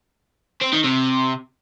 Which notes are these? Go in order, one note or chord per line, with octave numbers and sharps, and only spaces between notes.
C4
D#3
C3